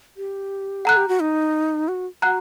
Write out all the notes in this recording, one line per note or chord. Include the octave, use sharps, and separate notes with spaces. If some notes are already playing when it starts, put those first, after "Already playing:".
G4
A4 F#5 A#5 F#6
G4
F#4
D#4
F#4
F#4 F#5 A#5 F#6